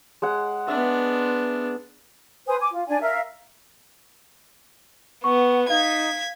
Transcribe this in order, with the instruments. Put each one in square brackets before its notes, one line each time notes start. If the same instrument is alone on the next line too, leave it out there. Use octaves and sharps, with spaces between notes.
[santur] G#3 F#5
[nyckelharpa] B3 D4 [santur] E5
[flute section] B4 C5 G#5 D#6
G#5 D6
F4
D4 D5 G#5
A#4 E5 F5
[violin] B3 [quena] F#5 [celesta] C#6
[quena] D#4 [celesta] F5 [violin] G#6 B6